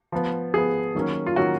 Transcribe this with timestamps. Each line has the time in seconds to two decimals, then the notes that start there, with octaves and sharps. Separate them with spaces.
0.12 F3 B3
0.54 F3 B3 G#4
0.95 D#3 F#3 A#3 C#4
1.26 F4
1.36 D#3 F#3 A#3 C#4 F#4